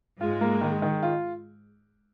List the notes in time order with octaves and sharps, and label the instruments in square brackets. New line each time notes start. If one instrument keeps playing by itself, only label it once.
[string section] G#2 G#3 [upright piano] F4
[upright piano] A#3
D#3
D#3
F4